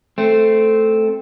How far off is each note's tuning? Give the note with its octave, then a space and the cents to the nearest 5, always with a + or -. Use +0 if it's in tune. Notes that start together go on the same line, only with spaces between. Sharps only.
A3 +0 C4 +0